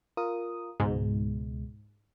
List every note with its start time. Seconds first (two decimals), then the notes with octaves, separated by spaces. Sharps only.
0.17 F4 A#4 D#6
0.80 C#2 G#2 B2 G#3